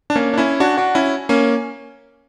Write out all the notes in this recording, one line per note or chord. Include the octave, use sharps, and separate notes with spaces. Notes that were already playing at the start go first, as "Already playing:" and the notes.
D4
A#3 C#4
D4
C#4 E4
D4 F#4
D4 F#4
C#4 E4
A#3 C#4